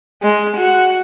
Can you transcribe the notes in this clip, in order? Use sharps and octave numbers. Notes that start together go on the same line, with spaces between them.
G#3
F#4